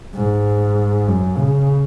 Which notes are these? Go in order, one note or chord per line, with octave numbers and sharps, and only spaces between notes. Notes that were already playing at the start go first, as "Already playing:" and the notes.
G#2
F#2
C#3